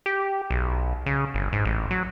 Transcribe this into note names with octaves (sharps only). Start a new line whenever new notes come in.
G4
B1
C#3
G1
G#2
A1
F#3